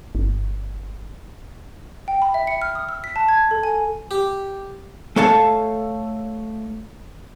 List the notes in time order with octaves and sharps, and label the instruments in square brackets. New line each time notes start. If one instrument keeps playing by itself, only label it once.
[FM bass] G1
[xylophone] G5
B5
E5
C#7
F6
D#6
E6
B6
A5
G#6
A4
G#5
[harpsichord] G4
[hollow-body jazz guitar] A3 A4 C#5 F5 A5